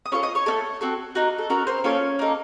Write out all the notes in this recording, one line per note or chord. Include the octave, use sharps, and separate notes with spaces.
D#6
C#4 F4 A4 C#5 C#6
D#5 D#6
C#5 C#6
A3 C#4 A4
C4 F#4 A4
A#3 D#4 F#4
A4
C#4 F#4 A4 A#4
C4 C5
A#3 C#4 F4 A4 C#5
A#3 D#4 A4